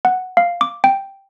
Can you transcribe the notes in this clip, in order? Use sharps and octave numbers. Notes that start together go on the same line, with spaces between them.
F#5
F5
D6
G5